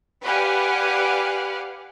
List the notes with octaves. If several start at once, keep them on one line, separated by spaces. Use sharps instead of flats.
G4 B4 D5 F5 F#5 G#5